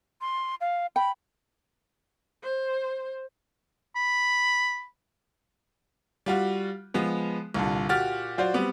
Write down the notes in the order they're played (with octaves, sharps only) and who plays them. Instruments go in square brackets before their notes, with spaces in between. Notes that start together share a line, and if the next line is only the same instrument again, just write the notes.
[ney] C6
F5
[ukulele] G5 [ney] B5
[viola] C5
[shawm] B5
[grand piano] G3 F4 F#4
F3 G#3 B3
C2 A#2 D3
A#2 F#4 G4 F6 A6
F#3 F4 F#4 C5 D5
G3 B3 C4